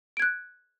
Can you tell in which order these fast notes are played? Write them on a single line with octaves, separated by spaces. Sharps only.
D7 G#6 F#6